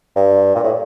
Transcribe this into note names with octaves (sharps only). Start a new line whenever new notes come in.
G2
A#2
A2